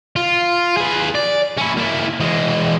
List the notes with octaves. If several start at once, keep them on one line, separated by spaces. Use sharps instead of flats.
F4
G#4 B4
D5
C#4 E4
A#3 E4
E3 G#3